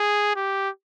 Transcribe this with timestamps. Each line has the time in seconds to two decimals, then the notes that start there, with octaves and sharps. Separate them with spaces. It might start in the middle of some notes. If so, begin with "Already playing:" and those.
Already playing: G#4
0.36 G4